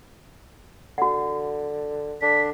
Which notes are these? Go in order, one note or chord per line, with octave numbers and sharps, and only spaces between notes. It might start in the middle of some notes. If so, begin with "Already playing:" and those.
D3 F#4 F#5
D3 D4 B6